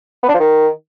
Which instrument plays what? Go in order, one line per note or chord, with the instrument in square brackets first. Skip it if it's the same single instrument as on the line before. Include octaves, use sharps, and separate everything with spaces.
[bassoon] B3
D4
F3
D#3